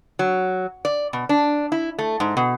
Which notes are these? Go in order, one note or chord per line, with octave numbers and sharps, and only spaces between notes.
F#3
D5
B2
D4
E4
A3
G#2
B2